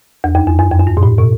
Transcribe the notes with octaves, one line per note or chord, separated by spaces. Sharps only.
E2
F2
F#2
F#2
F2
F#2
G2
A#2
A2
B2